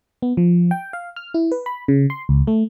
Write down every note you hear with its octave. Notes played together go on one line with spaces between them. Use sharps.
B3
F3
G5
F5
F6
E4
B4
B5
C#3
C6
C#2
A3